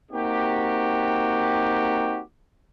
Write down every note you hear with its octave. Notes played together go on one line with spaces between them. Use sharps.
A#3 C4 D#4 F#4 G4